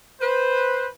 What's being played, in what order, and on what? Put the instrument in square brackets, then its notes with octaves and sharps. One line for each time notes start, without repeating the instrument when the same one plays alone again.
[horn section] B4 C5